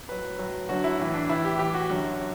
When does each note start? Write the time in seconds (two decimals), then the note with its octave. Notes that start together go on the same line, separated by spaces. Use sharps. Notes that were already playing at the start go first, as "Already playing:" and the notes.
0.08 A2 F#3 B4
0.38 A2 F#3
0.69 F#2 D3 F#3 F#4
0.84 E4
0.99 A2 E3 E4
1.14 D4
1.29 A2 E3 E4
1.45 G4
1.59 A2 E3 G4
1.74 F#4
1.90 F#2 D3 F#3